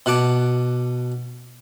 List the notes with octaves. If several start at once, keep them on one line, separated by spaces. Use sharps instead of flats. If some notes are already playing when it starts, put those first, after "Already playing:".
B2 F#5 A5 D6